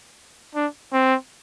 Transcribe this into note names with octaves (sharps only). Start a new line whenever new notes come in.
D4
C4